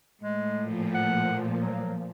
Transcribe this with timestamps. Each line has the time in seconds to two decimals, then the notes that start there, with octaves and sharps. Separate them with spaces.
0.21 A2 G#3
0.60 A#2 F3
0.94 F#5
1.61 F#3